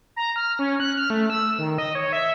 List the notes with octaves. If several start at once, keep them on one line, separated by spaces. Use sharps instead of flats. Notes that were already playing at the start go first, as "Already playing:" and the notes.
A#5
F6
C#4
F#6
F6
A3
E6
D#3
D#5
C#5
E5